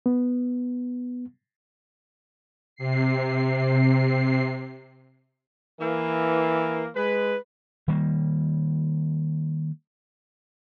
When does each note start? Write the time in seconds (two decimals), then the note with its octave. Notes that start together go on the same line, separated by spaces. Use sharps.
0.06 B3
2.76 C3 C7
5.81 E3 A#3
6.96 G#3 B4
7.88 D#3 G3 A#3